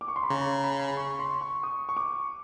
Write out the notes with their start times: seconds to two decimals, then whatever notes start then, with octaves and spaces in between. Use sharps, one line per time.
0.01 D6
0.08 C#6
0.16 C6
0.23 B5
0.30 C#3 A#5
0.64 B5
0.97 C#6
1.19 C6
1.41 C#6
1.63 D#6
1.89 C#6
1.97 D6